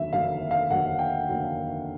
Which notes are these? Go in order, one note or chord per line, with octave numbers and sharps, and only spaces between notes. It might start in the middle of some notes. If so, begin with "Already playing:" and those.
Already playing: F1 D#2 D3 F#3 E5
F1 D#2 D3 F#3 F5
F5
F1 D#2 D3 F#3 F#5
G5
F1 D#2 D3 F#3